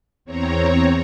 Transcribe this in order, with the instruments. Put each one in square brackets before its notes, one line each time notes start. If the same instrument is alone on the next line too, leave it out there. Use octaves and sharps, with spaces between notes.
[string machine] E2 C4 C#5 A#5